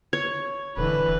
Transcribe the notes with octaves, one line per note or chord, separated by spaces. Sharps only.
C#5
D#1 D3 E3 B4